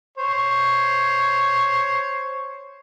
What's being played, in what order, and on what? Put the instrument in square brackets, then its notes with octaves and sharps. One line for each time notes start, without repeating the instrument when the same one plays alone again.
[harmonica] C5 C#5